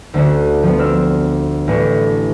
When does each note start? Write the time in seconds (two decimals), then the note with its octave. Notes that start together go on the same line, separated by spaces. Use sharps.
0.14 D2 A3 C#4 D4 F#4
0.63 F3 G3 B3
0.78 C4 D4 E6 F6
1.68 A1 E3 A3 D4 B4 C#6